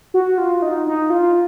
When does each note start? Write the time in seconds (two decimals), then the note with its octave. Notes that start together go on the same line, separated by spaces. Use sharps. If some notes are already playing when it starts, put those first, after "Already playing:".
0.14 F#4
0.38 F4
0.62 D#4
0.87 D#4
1.10 F4